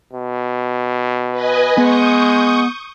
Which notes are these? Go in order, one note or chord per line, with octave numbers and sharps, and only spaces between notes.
B2
B4 D#5 G#5
G#3 B3 C#6 D#6 G6